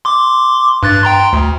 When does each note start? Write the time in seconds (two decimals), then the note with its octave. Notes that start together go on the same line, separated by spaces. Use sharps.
0.05 C6 D6
0.83 G2 F#6 A6
1.03 G5 A#5 C6
1.33 D2